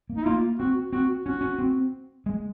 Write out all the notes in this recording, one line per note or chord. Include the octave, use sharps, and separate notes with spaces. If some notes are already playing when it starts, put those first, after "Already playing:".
A#3
D#4
A#3 F4
C4 F#4
C4 F#4
C#4 F#4
C#4
C4
G#3